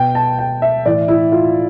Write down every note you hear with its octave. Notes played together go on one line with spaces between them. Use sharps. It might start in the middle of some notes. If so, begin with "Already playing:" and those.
Already playing: B2 G5
A5
G5
E5
A2 E3 D5
E4
F4